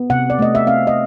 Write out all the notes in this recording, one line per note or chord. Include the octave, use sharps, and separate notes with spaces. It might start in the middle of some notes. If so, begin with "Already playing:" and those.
Already playing: B3
C3 F#5
D5
A3 D#5
E5
C4 F5
D#5